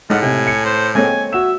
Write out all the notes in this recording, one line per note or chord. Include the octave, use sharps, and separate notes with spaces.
A2 G#3 D#4 F4 D#5 F#5 B6
C3 G#5
C#7
C5
G#3 A#3 C4 A4 C#5 G#5
F#4 E5 E7